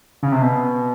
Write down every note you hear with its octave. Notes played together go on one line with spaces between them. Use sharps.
C#3
C3
B2